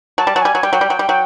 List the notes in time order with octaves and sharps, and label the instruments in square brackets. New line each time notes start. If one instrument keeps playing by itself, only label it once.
[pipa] F#3 [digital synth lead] A5
[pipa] G3
F#3
[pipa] G3 [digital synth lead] G#5
[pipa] F#3
[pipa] G3 [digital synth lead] G5
[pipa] F#3
G3
F#3
G3
F#3